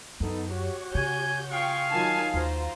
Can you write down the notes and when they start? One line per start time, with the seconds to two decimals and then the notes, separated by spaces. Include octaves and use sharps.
0.20 F#2 B3 D#4 A4
0.53 F#4 G4 C#5
0.95 C#3 G#5 G6
1.52 F4 G#4 F5 G5 C#6
1.92 D#3 F#3 F4 G#5 A5
2.34 D#2 F4 F#4 C5 A#5